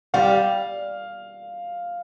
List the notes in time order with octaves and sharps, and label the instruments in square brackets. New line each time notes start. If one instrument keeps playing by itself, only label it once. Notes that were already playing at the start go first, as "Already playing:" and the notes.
[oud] G3 [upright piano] F5